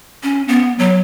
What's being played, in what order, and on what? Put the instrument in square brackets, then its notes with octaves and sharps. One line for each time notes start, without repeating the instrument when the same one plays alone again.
[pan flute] C#4
B3
F#3